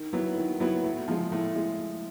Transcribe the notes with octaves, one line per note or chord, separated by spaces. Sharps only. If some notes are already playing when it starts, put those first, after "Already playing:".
Already playing: D#3
F#3 B3 E4
D#3
F#3 B3 E4
A2
F3 G#3
A2
G#3